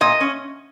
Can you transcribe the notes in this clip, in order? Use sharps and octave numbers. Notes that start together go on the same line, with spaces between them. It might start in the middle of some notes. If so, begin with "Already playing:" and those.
A#2 D#5
C#4